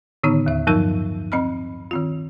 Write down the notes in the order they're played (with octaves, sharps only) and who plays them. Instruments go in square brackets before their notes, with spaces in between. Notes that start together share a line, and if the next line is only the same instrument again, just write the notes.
[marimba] A2 D3 D#3 B3 D#4 C#5
D#2 E5
G2 F3 F#3 D#4 A#4 E6
C4 D#5 B5 F6
D#3 C4 F4